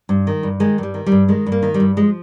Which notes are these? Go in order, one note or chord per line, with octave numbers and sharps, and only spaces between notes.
G2
D#3
G2
D#3 G#3
G2 G3
D#3
G3
G2
D#3 G#3
G2
A#3
D#3
G3
G2
F3 G#3